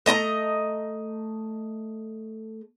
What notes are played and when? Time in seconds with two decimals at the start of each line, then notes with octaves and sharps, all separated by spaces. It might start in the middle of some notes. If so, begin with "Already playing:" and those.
0.06 A3 D#5 A5 A#5